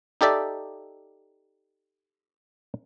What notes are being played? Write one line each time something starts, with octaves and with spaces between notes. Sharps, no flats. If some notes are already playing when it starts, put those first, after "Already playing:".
D#4 G4 A4 D5 E5